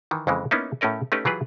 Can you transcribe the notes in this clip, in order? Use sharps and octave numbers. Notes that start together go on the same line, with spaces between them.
D#3 E3
F2 C#3 E3 G#3
A#3 B3 C#4 D#4 E4
A2 A3 C#4 A#4 D#5
A3 C#4 D#4 G4 B4
E3 F#3 F4 G4 G#4 B4